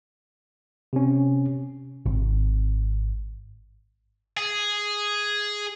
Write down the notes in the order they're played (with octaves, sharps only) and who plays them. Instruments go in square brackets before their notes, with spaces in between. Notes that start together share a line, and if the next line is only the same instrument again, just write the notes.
[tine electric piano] C3 C#4
[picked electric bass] G#1
[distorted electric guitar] G#4